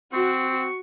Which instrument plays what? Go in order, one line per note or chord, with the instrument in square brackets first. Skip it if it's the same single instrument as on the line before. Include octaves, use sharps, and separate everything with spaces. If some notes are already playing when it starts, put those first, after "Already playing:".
[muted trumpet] C4 [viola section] F#4 [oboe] C#6